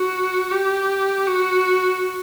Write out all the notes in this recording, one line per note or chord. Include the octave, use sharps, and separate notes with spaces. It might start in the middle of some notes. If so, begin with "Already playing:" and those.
Already playing: F#4
G4
F#4